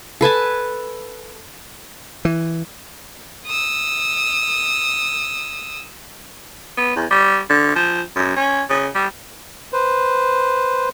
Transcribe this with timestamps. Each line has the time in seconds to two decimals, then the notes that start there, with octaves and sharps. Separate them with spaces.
0.21 A4 B4 G#5 A5
2.25 E3
3.46 D#6 E6
6.77 B3
6.96 E2
7.10 G3
7.50 D3
7.75 F3
8.16 F#2
8.36 C#4
8.69 C#3
8.95 G3
9.73 B4 C5